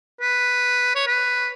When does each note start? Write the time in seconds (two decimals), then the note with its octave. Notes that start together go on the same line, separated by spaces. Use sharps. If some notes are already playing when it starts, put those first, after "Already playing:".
0.21 B4
0.95 C#5
1.07 B4